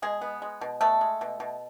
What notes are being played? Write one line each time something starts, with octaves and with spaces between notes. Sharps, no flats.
B2 G#3 G#4
B3
G#3
B2
A3 B3 A4
G#3
B2
B2